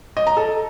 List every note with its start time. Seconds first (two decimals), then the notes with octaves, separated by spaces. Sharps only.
0.17 D#5
0.27 A#5
0.37 A4